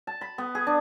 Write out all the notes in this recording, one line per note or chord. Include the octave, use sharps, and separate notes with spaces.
A5
B5
B3
G#4
D4